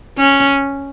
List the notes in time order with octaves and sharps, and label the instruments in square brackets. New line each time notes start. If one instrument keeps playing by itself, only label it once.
[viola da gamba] C#4